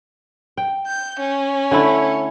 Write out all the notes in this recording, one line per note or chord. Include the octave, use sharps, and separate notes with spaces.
G5
G6
C#4
D3 A3 E4